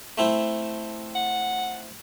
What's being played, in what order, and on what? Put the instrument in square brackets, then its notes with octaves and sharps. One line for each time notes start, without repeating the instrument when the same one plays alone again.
[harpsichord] A3 C4 E4
[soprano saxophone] F#5